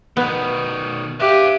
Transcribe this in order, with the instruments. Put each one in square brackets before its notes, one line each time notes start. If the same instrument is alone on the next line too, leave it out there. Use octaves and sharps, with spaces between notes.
[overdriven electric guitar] B2 D#3 [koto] B3
[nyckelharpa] G4 [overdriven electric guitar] B4 F5 [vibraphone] E5